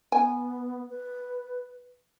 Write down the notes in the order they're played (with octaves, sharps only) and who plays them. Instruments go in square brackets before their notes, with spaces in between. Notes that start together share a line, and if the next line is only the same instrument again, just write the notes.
[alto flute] B3 [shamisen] G#5
[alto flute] B4